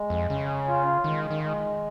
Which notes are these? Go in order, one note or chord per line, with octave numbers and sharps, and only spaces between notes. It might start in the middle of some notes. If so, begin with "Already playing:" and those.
Already playing: G#3
F2
C#3 C#4
F4
D#3 G#3
D#3
G#3